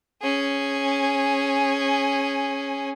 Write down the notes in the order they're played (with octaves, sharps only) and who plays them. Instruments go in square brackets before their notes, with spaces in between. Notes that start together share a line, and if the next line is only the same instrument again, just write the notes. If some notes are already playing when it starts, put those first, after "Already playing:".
[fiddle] C#4 G#4